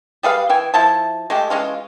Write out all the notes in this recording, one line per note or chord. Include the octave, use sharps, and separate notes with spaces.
G3 G#4 B4 F5
E3 G5 G#5
F3 E4 A5
G#3 A3 G4
E3 G#3 C#4 F4